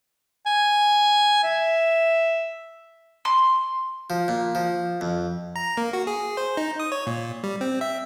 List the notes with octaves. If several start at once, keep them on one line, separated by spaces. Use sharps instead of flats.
G#5
E5
C6
F3
A#2
F3
F2
A#5
A#3
F#4
G#4
C5
D#4
D#6
C#5
A#2
G3
C4
E5